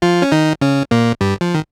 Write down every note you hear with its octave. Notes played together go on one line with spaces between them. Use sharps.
F3 F4
C#4
D#3 D#4
C#3 C#4
A#2 A#3
G2 G3
F3
D#3